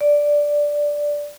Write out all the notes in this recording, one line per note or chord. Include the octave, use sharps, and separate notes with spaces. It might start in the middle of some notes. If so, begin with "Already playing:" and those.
D5